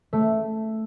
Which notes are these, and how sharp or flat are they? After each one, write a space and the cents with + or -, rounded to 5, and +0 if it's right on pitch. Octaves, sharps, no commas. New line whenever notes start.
A3 +0